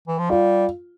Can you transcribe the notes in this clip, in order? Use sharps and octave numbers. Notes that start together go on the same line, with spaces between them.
E3
F3
G3 F4